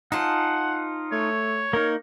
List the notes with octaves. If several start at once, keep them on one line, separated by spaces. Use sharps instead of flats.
D#4 F4 C5 F#5 G#5 A5
A3 C#5
A#3 D#4 A#4